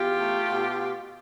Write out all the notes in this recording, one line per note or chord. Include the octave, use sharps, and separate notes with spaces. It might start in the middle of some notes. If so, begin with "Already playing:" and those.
Already playing: E2 F4 G4
A3
B2